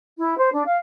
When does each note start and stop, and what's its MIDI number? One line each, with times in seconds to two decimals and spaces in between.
0.19 0.37 64
0.37 0.49 72
0.52 0.62 62
0.66 0.77 77